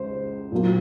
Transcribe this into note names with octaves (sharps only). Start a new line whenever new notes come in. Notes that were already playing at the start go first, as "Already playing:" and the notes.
Already playing: C#2 C#3 C5
A#2 F#3 A#3